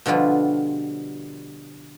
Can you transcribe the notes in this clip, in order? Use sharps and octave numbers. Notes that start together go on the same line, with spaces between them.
B2 D3 F3 G3 F4